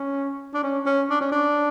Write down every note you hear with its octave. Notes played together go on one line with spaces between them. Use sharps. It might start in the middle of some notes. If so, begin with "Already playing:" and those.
Already playing: C#4
D4
C#4
C#4
D4
C#4
D4